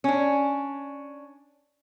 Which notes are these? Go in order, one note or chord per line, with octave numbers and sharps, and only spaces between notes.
C#4 D4